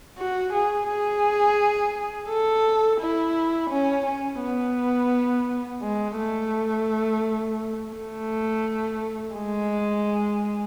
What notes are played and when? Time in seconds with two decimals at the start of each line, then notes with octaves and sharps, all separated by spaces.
0.18 F#4
0.53 G#4
0.88 G#4
2.29 A4
3.00 E4
3.71 C#4
4.06 C#4
4.41 B3
5.82 G#3
6.18 A3
7.94 A3
9.35 G#3